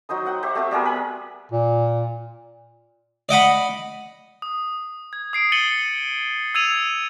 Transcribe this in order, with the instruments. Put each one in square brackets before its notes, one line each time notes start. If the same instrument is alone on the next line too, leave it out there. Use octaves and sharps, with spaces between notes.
[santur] F#3 D#4 C5 D#6
D#5 F#5 G5
G4 C5 E5
A3 C4 F#4 E5
G3 B3 G#4 A#4
A#4 G#5
[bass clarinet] A#2
[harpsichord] D5 D#5 F#5 B5
[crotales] D#6
G#6
D#6 C7 D7
A6 C#7 D#7 F#7 G7
E6 G#6 D#7 F7